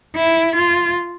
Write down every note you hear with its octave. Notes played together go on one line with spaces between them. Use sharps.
E4
F4